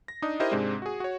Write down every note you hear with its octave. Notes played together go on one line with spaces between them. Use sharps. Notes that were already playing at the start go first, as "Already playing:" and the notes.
A#6
D4 D#4 D#6
E4 G4 A#4 C5 D#5 E5
G#2 C3 G#3 C4 D4
F#4 G#4
F#4 C#5